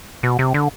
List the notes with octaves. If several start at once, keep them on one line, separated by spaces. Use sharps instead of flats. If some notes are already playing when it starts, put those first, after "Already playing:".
B2
C3
D3